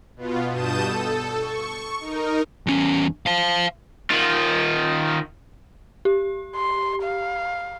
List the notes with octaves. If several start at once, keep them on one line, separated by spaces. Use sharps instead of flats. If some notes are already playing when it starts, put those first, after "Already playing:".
B2 B3 F4
G2 B2 A5 D#6 G6 E7
A4
C#6
D#4 A#4
E2 C#4
C5 F5
D#3 F4
G4
C6
F5